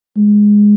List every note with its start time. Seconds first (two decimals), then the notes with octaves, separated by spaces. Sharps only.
0.17 G#3